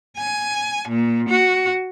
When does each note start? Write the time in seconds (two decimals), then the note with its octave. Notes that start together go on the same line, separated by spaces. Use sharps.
0.17 G#5
0.89 A#2
1.30 F#4